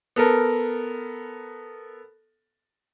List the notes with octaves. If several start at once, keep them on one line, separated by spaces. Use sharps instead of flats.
B3 A4 A#4